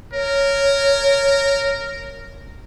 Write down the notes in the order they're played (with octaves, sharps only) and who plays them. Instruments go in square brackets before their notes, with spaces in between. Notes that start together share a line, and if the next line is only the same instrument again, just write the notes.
[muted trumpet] A#4 [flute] C#5